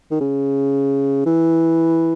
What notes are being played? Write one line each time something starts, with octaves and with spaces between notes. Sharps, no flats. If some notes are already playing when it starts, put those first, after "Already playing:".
D#3
C#3
E3